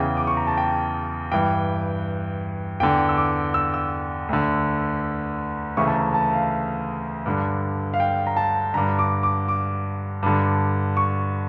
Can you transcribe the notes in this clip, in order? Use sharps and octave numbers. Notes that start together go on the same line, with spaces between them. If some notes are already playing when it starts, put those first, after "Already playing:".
Already playing: E2 C#3 E3 G5
D6
C#6
A#5
A5
G5
G2 E3 G5
E2 D3 G5
E6
D6
E6
E6
D2 D3
D2 C#3 E3 C#6
A5
A#5
A5
F5
G2 D3
F5
G5
A#5
A5
G2 D3 A#5
D6
D6
D6
G2 D3
C#6